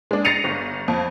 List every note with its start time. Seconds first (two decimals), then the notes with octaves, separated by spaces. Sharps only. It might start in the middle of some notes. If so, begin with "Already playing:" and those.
0.11 G#3 D4
0.25 A6 A#6 C7 C#7 D#7 F7
0.44 G1
0.88 F2